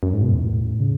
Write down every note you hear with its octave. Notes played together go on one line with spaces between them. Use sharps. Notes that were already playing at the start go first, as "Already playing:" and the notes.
F#2
G#2
B2
E2
A2
C#3